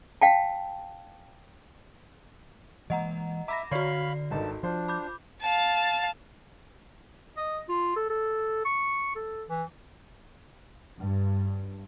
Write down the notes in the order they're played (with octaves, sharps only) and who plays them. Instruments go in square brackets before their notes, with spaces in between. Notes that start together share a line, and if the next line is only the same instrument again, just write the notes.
[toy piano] F5 G5 A5
[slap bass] E3 G#3 A#3 [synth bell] D#5 F#5 A#5
[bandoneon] E5 [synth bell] A#5 B5 A#6 [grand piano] D6
[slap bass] D3 [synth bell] F#4 D5 [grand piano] C#5 C7 [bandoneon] F5 B5
[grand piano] G#1 D#4 A4 [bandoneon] G2 A5
[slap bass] F3 [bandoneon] D4 [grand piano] F4 C5
[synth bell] B5 D6 G6
[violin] F5 A5
[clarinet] D#5
F4
A4
A4
C#6
A4
E3
[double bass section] G2